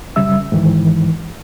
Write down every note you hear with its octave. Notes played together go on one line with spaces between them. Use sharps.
F#2 C#3 G3 E5 E6
G#2 D#3 E3